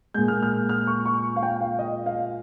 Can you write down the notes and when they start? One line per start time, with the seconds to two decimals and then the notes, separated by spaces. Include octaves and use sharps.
0.14 A#2 G#3 G6
0.28 F6
0.43 F6
0.69 F6
0.87 C#6
1.06 C#6
1.36 F5
1.43 G5
1.61 F5
1.79 D#5
2.06 F5